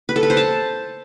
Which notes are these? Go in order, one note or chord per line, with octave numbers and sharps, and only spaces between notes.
B4
A4
B4
C5
A5